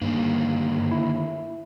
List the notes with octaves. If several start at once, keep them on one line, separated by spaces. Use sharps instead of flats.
G2 D3 D#3 A#3
E4